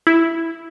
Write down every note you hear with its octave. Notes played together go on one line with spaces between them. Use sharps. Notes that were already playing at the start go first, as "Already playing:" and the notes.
E4